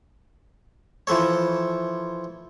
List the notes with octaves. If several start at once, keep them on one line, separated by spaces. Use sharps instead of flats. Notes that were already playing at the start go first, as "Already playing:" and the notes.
E3 F3 A4 C#5